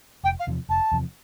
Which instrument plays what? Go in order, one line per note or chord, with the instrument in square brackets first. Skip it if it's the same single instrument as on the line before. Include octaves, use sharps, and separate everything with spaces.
[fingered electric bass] F1 [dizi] G5
[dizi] F5
[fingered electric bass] E2 C3 F3
[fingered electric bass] F1 [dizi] A5
[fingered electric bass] E2 C3 F3